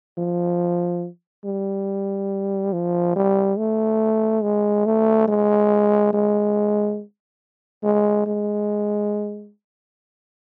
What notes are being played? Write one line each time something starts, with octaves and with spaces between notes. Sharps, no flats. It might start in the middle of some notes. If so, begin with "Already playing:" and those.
F3
G3
F3
G3
A3
G#3
A3
G#3
G#3
G#3
G#3